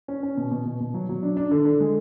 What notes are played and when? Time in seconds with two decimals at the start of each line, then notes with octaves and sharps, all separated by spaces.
0.08 C#4
0.23 C#4
0.37 B2
0.51 B2
0.65 B2
0.80 B2
0.94 F#3
1.09 F#3
1.23 D4
1.37 D4
1.51 D3
1.65 D3
1.80 G#3